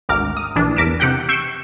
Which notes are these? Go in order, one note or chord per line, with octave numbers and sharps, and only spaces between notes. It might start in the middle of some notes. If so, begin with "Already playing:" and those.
G#1 D2 A#4 D6 F6
D#6 D#7
A#1 E3 D4
E2 A#4 D6 B6 D7 E7
C3 G4 F#5 G5
C#6 E6 G6 C7 D7